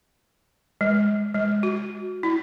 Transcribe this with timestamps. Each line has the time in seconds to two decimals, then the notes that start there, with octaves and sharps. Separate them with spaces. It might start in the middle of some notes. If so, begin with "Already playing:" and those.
0.81 G#3
1.34 G#3
1.63 F#4
2.23 E4